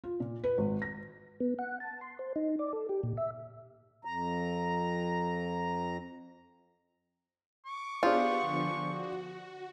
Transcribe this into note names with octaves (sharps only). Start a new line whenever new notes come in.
F4
A#2
B4
G#1
A#6
B3
F#5
A5
C6
C5
D#4
D5
A4
G4
A#2
E5
F2 A#5
C#6 D6
B3 D4 F4 G4 G#4 C5 F#5
D3 F3
F#4